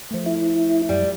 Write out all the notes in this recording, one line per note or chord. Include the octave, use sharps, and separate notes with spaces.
F3 A3
E4
F#2 G3